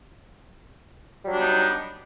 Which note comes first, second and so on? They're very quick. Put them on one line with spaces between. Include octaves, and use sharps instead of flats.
G3 F#3 D4 B3 D#4